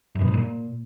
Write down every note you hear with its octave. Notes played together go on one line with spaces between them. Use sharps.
F#2
B2
G#2
A#2